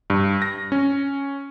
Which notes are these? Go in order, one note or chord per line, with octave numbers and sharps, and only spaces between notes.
G2
A#6
C#4